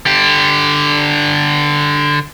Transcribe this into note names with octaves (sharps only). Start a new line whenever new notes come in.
D3 G4